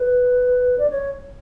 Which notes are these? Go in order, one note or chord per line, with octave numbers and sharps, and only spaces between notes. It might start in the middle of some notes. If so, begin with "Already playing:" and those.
Already playing: B4
D5
C#5